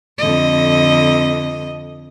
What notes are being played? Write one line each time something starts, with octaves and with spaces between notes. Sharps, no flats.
F2 D3 D#5